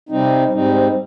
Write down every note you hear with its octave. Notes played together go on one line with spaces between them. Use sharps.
C3 G3 C4 D#4
G#2 G3 C4 D#4